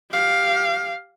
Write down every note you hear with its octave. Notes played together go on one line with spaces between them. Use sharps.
G4 F5